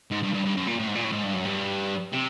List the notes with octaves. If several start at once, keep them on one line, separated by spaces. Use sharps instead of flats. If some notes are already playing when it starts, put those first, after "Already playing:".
G#2
G2
G2
G2
F#2
A#2
A2
G#2
A#2
A2
G#2
G2
F#2
G2
C3